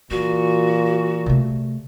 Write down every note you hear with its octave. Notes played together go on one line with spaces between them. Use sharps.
A#2 E3 F#4
C3 A3